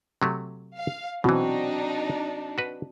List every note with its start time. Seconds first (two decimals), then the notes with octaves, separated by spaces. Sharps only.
0.22 C3 F#3 A3
0.75 F5
1.24 B2 E3 C4 D4 D#4 F#4
2.58 F#4 B4